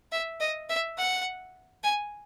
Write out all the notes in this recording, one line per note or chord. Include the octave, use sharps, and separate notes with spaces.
E5
D#5
E5
F#5
G#5